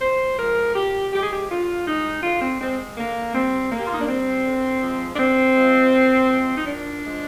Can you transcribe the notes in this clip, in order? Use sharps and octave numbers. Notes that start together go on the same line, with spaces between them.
A#2 C5
F3 G#3 A#4
A#2 G4
F3 G#3 G4
G#4
G4
D3 F4
G#3 D#4
D3 F4
C4
G#3 C4
D3 A#3
G3 C4
D3 A#3
G4
F4
D#4
D4
G3 C4
D3
F3 G#3
D4
D3 C4
F3 G#3
A#2
F3 G#3
D#4
A#2 D4
F3 G#3